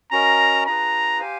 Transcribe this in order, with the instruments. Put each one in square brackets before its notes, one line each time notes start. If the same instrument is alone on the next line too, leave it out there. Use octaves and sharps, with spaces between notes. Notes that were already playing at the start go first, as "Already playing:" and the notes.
[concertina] C#4 F#4 A#4 D#5 [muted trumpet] A#5
[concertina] D4 F4 G#4 B4 [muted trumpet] A#5
[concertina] G4 C5 F5 G#5